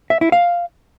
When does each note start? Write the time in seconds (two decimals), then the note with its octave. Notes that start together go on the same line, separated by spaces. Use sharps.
0.10 E5
0.21 E4
0.32 F5